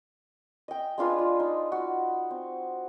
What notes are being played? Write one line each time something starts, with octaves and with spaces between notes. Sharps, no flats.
D#5 G5
G#3 D4 F4 B4
F4
D#4
F#4
C4